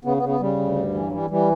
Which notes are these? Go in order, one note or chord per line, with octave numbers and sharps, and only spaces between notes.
C#3 B3
B3
C#3
B3
C#3 G3
D2
G2
E3
F#3
E3 G3
E3 G3